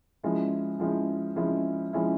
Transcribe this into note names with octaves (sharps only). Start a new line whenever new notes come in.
F3 G#3 C#4 E4
F3 G#3 C#4 E4
F3 G#3 C#4 E4
F3 G#3 C#4 E4